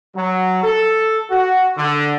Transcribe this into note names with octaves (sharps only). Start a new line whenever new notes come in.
F#3
A4
F#4
D3